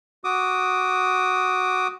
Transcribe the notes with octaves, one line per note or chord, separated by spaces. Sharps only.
F#4 D6 D#6